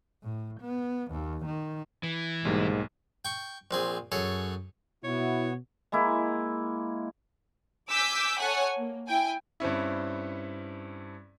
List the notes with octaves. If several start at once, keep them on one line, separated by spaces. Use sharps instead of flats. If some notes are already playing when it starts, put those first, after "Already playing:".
A2
B3
D#2
D#3
E3
B1 G#2 G3 A#3
G5 C#6
A#1 C4 G#4
F#2 G#4 A4 C#5
B2 B3 E4 F#4 C#5
G#3 A#3 E4
G#5 D6 E6 G6 B6
A4 C#5 F#5 G#5
A#3
E4 G5 G#5
G2 C4 C#4 E4